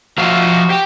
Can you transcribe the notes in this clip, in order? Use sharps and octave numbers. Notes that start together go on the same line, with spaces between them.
F3 D#4 F#4 E5 F5
G4